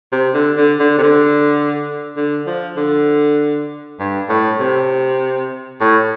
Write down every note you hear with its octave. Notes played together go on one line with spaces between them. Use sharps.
C3
D3
D3
D3
C3
D3
D3
F3
D3
G2
A2
C3
A2